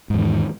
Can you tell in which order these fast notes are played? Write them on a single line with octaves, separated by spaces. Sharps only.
G#2 E2 D#3